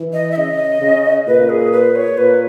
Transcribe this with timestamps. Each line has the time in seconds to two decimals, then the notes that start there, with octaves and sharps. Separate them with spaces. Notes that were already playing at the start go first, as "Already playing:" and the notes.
Already playing: E3
0.13 D#5
0.31 E5
0.36 C#3 D#5
0.81 C#3
1.27 A#2 B4
1.49 G#4
1.72 B4
1.95 C#5
2.18 A#2 B4